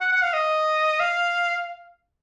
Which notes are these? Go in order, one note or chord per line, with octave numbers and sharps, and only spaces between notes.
F#5
F#5
F5
D#5
F5